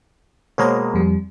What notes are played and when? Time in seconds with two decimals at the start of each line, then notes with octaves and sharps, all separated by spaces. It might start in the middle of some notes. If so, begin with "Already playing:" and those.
0.58 B2 G#3 A#3 C5 C#5 A#5
0.94 F2 G3